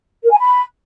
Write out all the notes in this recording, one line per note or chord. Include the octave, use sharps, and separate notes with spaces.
A#4
G#5
B5